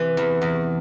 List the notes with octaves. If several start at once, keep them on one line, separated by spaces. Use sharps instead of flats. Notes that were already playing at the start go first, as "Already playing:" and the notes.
Already playing: C3 E3
E2
E2